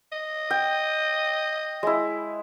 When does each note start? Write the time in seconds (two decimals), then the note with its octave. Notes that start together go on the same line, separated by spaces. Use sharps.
0.12 D#5
0.51 G5
1.83 G#3 E4